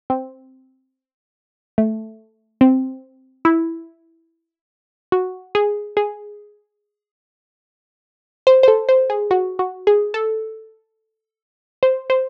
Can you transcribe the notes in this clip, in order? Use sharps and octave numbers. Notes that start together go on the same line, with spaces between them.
C4
A3
C4
E4
F#4
G#4
G#4
C5
C5
A4
C5
G#4
F#4
F#4
G#4
A4
C5
C5